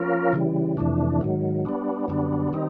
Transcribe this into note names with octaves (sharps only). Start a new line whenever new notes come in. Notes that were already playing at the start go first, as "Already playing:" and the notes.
Already playing: F3 A#3 C#4 F4 A#4
C#3 E3 G3
F2 C3 E3 A3 D4
G#2 D#3 F#3
G3 B3 D4
F#2 D3 G3 B3 D4
D#3 G3 C4 D#4